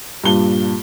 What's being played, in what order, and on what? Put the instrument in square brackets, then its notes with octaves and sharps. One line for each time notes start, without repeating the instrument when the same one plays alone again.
[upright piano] G2 A#2 G7